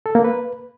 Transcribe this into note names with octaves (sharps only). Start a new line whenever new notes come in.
A4
A#3
B4